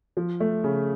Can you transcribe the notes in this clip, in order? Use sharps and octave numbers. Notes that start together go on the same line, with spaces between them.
F3
A3
C#3